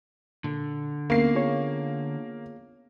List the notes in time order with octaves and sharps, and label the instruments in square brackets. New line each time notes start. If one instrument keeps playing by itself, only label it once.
[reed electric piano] A#2 [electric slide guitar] D3
[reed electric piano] D2 [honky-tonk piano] A#3 C7 [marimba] B3 C#4 A#4
[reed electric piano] F4 G#4 C#5